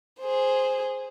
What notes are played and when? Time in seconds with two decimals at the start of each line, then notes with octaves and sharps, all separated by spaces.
0.20 G#4 C5